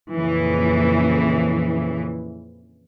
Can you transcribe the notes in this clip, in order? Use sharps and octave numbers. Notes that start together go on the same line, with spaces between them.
F2 A#2 C#3 E3